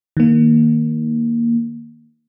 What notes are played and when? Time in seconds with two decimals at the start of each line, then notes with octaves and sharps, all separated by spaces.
0.17 D#3 A#3